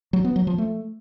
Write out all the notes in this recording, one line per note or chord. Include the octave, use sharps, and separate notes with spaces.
F#3
B3
F#3
F3
A3